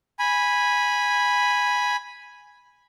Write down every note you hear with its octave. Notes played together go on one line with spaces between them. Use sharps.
G#5 B5